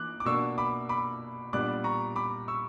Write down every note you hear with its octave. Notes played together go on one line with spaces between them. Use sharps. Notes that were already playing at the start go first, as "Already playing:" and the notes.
Already playing: E3 A#3 D6 F#6
D6
B2 A#3 D4 C#6 E6
B5 D6
B5 D6
A#2 G3 B3 D4 D6 F#6
A#5 C#6
B5 D6
C#6 E6